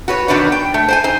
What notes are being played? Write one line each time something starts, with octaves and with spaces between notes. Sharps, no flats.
F#4 B4 C#5
B2 D#3 D4 F#4 B4 C#5
G5
A3
C5 G5 G#5
D#4 C5